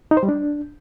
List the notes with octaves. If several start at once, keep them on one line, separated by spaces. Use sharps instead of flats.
D#4
C5
G3
D4